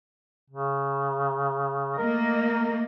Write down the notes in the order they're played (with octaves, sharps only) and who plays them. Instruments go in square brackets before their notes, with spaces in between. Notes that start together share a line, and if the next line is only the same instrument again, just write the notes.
[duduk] C#3
[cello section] A3 A#3 D#5 [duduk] A#4